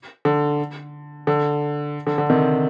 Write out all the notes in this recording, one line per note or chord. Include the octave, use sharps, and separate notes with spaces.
D3
D3
D3
D3
C3 D#3